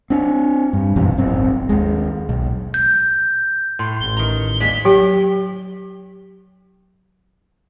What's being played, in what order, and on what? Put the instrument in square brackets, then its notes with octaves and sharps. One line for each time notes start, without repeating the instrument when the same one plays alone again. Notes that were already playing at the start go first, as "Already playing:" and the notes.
[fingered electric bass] C4 D4
G2
A#1 F#2 C3 E3
D1 G1 C4
D#2 G#3
B1
[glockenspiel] G6
[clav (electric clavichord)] A2 [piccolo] C6
[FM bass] A1 [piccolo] G7
[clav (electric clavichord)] D#3 A#5
[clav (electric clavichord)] D#2 G#3 D5 [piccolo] B6
[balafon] F#3 G4 G5